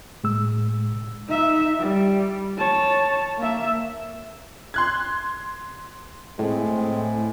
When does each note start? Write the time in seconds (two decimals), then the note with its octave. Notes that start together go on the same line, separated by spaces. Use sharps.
0.24 A2 G#3 E6
1.28 D#4 E5
1.79 G3
2.58 C#5 A5
3.38 A#3 E5
4.74 C6 F#6 G#6
6.39 A2 G#3 C4